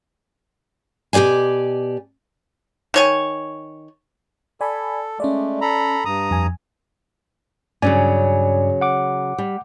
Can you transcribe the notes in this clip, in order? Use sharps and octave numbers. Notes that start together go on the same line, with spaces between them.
B2 G4 C#5 D5 G#5
D#3 C#5 G#5
A4 D5 G#5 B5
G#3 A3 C#4 D5
A4 A#5 B5
G2 A#5 D#6
F2 G#5
G2 C#3 F#3 C#4 D5 G#5
F#5 D6
G3